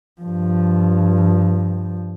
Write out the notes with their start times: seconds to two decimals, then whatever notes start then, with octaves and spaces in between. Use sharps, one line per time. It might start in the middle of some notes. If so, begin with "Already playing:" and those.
0.22 G2 F3